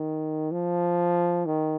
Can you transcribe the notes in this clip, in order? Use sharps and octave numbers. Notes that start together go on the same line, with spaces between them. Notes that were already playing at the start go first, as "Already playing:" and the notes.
Already playing: D#3
F3
D#3